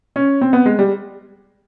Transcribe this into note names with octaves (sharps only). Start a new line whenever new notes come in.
C#4
C4
B3
G#3
G3